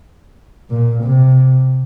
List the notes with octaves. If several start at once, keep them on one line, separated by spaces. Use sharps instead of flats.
A#2
C3